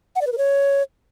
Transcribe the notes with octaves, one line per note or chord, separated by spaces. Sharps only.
F#5
D5
B4
A#4
C#5